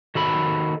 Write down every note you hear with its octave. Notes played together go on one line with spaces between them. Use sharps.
D#3 F#4 A4 B5